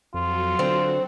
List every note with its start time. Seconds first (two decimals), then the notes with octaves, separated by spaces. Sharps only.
0.14 F2 F#3 F4 F#4 A4
0.59 D3 C4